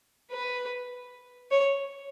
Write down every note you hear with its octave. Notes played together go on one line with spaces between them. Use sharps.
B4
C#5